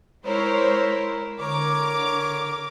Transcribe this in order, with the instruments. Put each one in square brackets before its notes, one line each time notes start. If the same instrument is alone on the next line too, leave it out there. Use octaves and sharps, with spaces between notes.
[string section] G#3 C5 C#5 [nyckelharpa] E4 A#4
[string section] D3 D6 [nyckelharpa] A#4 C#5